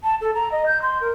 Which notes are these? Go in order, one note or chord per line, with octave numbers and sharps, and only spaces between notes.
A5
A4
A#5
D#5
G6
C6
A#4